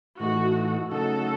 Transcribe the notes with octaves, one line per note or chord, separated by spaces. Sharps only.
A2 E3 A3 D#4 F#4
C#3 F#3 A3 D#4 F#4 A4